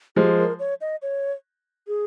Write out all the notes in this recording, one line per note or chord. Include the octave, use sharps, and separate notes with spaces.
F3 G#3 G4
A#4
C#5
D#5
C#5
G#4